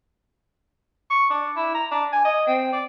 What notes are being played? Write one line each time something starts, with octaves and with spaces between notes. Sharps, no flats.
C#6
D4
E4
A#5
D4
G#5
D#5
C4
D5